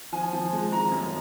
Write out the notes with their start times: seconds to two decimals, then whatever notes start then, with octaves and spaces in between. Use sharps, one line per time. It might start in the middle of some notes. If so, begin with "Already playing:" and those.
0.12 F3 G#5
0.33 F3
0.53 G#3
0.72 G#3 A#5
0.92 F#2